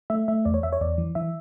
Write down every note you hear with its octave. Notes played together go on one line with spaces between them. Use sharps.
A3 E5
A3 E5
E2 D5
C#5
E2 E5
C#5
E2 D5
E3
E3 E5